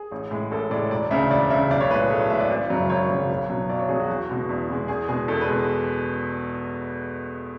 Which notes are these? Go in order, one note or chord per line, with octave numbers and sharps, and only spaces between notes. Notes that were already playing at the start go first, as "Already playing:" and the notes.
Already playing: G#4
A1
A2 G#3
A1 A4
A2 G#3 D5
E1 D5
D2 C#3 E5
E1 D5
D2 C#3 E5
B1 D5
C#5
A2 G#3 B4
G#4
B1 A4
C#5
A2 G#3 E5
D5
G#1
F#2 C#3 F#3
G#1 C#5
F#2 C#3 F#3
B1
B2 F#3
B1 D5
C#5
B2 F#3 G#4
F#4
E2
B2 G#3
E2
B2 G#3
E2 G#4
B2 G#3 G#4
E2 A4
B4
B2 G#3